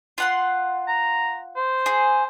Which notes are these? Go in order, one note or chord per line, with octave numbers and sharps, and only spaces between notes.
F4 F#5 C6
A#5
C5
G#4